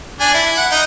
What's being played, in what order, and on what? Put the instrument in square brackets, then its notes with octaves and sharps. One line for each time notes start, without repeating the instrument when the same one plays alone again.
[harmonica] D4 G#5
E4
F#5
D#4